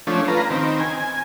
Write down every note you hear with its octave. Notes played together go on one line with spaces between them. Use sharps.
F3 A3 C#4 D4
F4 B4 A#5
D#3 C4
G#5